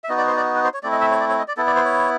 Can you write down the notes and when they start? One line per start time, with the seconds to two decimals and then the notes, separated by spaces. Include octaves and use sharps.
0.04 E5
0.09 B3 D#4 F#4 D#5
0.18 D5
0.27 C5
0.37 D5
0.55 B4
0.64 C5
0.74 C#5
0.83 A3 C4 E4 D5
0.92 D#5
1.01 E5
1.11 C#5
1.20 D5
1.29 C#5
1.39 D#5
1.48 D5
1.57 B3 E4 A4
1.67 D5
1.76 C5
1.85 C#5